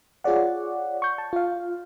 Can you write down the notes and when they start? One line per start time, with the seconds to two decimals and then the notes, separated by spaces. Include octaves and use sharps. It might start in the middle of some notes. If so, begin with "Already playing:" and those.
0.24 F4 G#4 C#5 D5 F#5
1.02 C#6 G6
1.18 A5
1.33 F4 F5